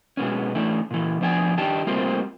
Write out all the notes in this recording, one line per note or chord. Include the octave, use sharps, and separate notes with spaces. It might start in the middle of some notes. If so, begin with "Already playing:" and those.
B2 G#3 B3 C#4
E3 A3 C#4 D4
A#2 E3
F3 B3 D4 G5 G#5
D#3 G3 D4 G4 A5
G3 A3 A#3 C4 F4 C5